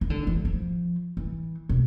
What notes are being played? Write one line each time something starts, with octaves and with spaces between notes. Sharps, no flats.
D#3
D3
E3
F3
E3
B2